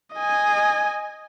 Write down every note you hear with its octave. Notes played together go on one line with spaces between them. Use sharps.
D#5 G#5